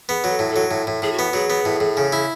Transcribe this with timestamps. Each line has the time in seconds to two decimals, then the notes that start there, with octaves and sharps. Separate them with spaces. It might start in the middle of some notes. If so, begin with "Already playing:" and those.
0.09 B3 G#4
0.24 F#3
0.29 A4
0.39 A2
0.50 A4
0.56 F#3
0.71 A2
0.87 A2
1.02 A2 G#4
1.13 F#4
1.19 B3
1.33 F#3 G#4
1.50 B3
1.65 A2
1.80 A2
1.97 C#3
2.12 E4